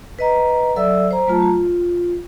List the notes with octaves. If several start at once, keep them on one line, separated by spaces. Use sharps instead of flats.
B4 D#5 A#5
F#3 A4 D5 E5 E6
C5 A#5
F#3 A3 F4 A5 A#5
F4